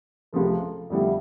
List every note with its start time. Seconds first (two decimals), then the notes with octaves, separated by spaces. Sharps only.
0.33 C#2 C3 F3 A3
0.90 F2 D3 G3 B3 E4